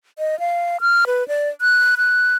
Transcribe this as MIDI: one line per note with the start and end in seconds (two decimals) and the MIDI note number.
0.19 0.38 75
0.40 0.77 77
0.81 1.05 89
1.07 1.26 71
1.28 1.49 74
1.61 1.95 90
1.98 2.37 90